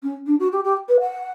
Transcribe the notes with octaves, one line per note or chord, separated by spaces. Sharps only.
C#4
D4
F#4
G4
G4
B4
F#5